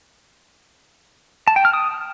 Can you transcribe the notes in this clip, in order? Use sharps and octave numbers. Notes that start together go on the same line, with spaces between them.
A5
G5
F6
D#6